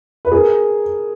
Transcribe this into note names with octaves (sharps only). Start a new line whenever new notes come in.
B4
G#4 A#4